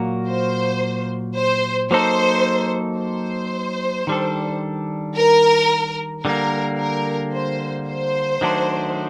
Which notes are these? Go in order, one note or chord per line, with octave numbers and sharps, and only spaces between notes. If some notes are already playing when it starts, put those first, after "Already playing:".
Already playing: A#2 F#3 A#3 F#4 A#4
C5
C5
F#3 A#3 D#4 A4 C5
C5
D#3 G3 D4 A4
A#4
D3 G3 A#3 A#4
A#4
C5
C5
D#3 F#3 A3 D4